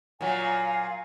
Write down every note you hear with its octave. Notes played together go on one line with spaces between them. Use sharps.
A#2 F#3 F5 G#5